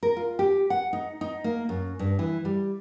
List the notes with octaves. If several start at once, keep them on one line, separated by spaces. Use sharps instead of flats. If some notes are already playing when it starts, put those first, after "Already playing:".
A#4
F4
G4
F#5
D#4
D#4
A#3
F#2
G2
E3
G3